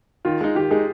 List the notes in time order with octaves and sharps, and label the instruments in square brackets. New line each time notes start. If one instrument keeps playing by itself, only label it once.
[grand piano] D#3 [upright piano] F4
[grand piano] G#3 D#4
[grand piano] D#3 [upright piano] G4
[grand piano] G#3 D#4 [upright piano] G#4